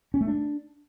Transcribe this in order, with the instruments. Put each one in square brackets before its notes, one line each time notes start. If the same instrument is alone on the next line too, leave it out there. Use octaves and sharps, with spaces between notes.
[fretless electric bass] C#4
A3
D4